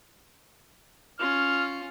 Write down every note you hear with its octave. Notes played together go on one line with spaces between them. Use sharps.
C#4 F4 F6